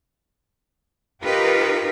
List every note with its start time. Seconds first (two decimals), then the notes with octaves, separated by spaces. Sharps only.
1.23 D#4 F4 G4 A#4 B4